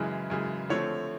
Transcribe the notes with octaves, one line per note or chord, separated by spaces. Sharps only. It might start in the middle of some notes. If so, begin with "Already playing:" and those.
Already playing: F#2 C#3 E3 G#3
F#2 C#3 E3 G#3
D3 F3 A3 C4 C#5